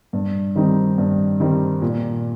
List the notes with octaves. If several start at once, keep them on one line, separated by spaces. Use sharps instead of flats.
G2
D#3 G3 C4 D#4
G2
D#3 G3 C4 D#4
A#2